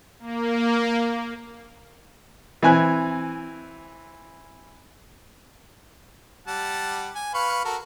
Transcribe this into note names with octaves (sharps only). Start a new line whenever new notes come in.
A#3
E3 C4 G#5 F#6
G3 F#5 A5
G#5
B4 F5 C#6
F#4 A4 A#4